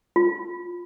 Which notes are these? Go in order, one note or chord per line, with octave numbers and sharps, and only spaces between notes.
F4